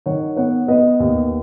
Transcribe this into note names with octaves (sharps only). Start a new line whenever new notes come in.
D#3 C#5 F#5
B3 C#5 F#5
B3 B4 D#5
D#2